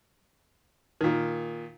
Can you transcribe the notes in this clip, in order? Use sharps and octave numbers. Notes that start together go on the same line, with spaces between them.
A#2 D#3